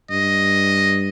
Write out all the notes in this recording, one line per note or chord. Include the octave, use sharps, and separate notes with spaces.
G2 D#5